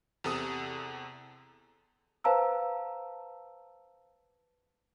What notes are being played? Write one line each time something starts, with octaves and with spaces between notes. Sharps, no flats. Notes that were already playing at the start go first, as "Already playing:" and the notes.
E2 C3 A4 D#6
B4 C5 F5 A5 A#5 E6